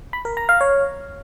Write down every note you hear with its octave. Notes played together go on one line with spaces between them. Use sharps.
B5
A#4
A#5
F5
C#5